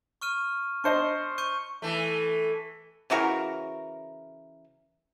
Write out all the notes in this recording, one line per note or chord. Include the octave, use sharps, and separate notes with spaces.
C#6 F6 D#7
D4 C5 D#5 C#6 C#7
C#6 G6 D#7
E3 A3
C#3 E3 F#4 A#4